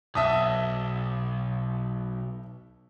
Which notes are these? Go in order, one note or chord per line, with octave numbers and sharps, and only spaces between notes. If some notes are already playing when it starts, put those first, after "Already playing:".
B1 E5 A5 D#6